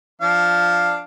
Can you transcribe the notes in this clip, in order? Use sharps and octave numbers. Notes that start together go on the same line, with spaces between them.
F3 D4 F5